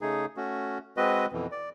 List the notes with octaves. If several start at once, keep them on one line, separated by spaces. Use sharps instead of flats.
C#3 A3 D#4 G#4
A3 C#4 F#4
G#3 C4 F#4 B4 D#5
F2 B2 E3
D5